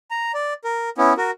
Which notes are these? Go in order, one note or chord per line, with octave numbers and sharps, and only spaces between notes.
A#5
D5
A#4
B3 C#4 E4
F#4 A#4